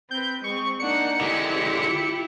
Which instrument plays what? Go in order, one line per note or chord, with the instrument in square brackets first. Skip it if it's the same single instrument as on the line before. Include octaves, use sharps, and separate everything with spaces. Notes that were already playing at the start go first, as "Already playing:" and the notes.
[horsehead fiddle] C4 B4 [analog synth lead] G6
[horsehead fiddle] G#3 C4 [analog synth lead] C#6
[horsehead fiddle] A#3 D#4 [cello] D4 F#5 [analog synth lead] C#7
[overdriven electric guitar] D3 G#3 [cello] E4 G4
[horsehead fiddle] C#4 C5
F4